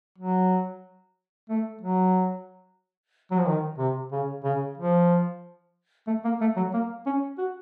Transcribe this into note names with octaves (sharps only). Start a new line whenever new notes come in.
F#3
A3
F#3
F#3
F3
D#3
C3
C#3
C#3
F3
A3
A#3
A3
F#3
A#3
C#4
F#4